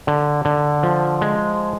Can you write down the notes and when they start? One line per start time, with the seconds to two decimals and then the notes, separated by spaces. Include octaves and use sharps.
0.07 D3
0.45 D3
0.83 F3
1.21 G#3